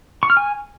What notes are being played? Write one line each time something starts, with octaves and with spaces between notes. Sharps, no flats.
C#6
F6
G#5